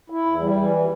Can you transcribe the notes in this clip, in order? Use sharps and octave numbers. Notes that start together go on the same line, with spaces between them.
E4
E2
G3
E3